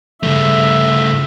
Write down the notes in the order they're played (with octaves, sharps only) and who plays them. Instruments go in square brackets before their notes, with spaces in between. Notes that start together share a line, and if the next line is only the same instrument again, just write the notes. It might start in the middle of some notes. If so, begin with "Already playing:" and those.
[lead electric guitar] G2 A3 [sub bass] C#3 [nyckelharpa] E5